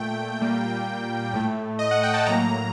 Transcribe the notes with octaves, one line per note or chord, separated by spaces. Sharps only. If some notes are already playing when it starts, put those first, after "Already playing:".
Already playing: A#2 A3 G5
A#2 G3 A#3
A2 A3
D#5
F#5
G5
A5
A2 F#3 A#3 A#5